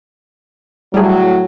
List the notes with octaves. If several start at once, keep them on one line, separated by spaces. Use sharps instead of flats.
A2 F#3 G3 G#4